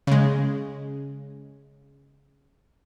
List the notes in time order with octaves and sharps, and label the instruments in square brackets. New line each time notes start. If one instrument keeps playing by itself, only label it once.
[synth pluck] C#3 G#3